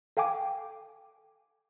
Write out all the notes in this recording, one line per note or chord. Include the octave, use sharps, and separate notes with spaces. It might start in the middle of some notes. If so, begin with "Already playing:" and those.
A4 F5 G5 G#5 D6